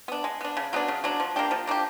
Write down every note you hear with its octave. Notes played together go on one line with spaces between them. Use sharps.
B3 D4
G#3
B3 D4
C#3
F#3 B3 D4
C#3
F#3 B3 D4
F3
A#3 D4 G4
F3
A#3 D4 G4